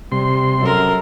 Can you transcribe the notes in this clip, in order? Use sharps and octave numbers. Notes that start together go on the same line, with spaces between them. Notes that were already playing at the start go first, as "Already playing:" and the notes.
C3 G3 C6
F#2 A4 A#4